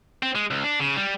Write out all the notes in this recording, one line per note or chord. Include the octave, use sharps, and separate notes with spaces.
C4
G#3
C#2
D4
C#3
G3